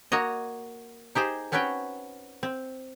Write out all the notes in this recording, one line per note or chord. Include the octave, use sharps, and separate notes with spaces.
A#3 F#4 C#5 D#5
D#4 G4 G#4 C5
C4 C#4 F#4 B4 C#5 G5
C4